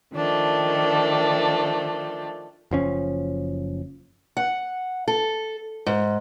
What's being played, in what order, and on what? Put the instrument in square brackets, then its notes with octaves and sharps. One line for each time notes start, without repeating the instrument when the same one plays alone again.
[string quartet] D#3 F3 A3 D4
[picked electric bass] F#1 F3 C#4
[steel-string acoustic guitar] F#5
A4
G#2